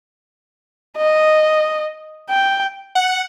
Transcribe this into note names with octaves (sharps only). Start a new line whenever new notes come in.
D#5
G5
F#5